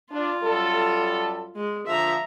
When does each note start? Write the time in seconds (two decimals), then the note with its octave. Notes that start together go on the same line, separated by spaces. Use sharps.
0.11 D4 F4
0.42 F#2 G3 A4
1.56 G#3
1.86 D3 F3 E5 A#5